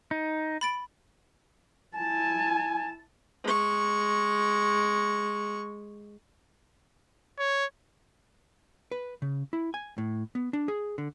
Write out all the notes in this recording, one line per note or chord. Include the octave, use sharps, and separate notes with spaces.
D#4
B5 A6 D7
E4 G#5 A5
G#3 C#6
C#5
B4
C#3
E4
G#5
A2
B3
D4
G#4
D3